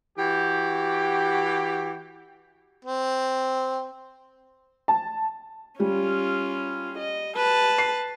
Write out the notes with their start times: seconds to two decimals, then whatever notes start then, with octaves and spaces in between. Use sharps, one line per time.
0.19 E3 F#4 G4
2.85 C4
4.88 A5
5.80 G3 C#4 F4
6.98 D#5
7.36 B4 A5
7.78 C7